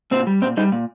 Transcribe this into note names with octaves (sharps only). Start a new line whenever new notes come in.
A#2 C4
G3
A#2 C4
G3 D#4
A#2